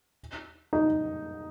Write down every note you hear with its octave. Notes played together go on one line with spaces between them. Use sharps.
D#4